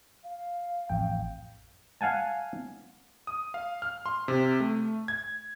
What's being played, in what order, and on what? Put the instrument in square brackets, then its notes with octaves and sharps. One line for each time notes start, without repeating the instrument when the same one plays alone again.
[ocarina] F5
[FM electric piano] A1 F2 G5
[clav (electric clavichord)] F5 F#5 G#5 A5
[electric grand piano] D#6
F5
F6
C6
C3
A3
G#6